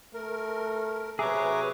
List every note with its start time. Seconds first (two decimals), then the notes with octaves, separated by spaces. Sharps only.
0.14 A3 A#4
1.19 C3 F#3 G#4 B4 C#5 E5 A#5 D6